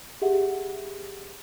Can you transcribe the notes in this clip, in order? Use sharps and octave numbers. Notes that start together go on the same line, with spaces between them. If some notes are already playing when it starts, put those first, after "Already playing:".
G4 G#4 E5 F#5